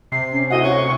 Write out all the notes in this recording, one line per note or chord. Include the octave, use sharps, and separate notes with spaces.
C3 C7
C#4
D2 E4 F#4 D#5 F#5
C#5 C#6